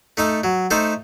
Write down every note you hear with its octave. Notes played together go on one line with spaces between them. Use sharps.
A3 D#4 A4
F#3
A3 D#4 A4 C5